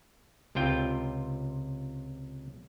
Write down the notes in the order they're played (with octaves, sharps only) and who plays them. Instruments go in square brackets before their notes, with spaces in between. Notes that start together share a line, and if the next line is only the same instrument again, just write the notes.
[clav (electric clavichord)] C#2 C3 F4 G5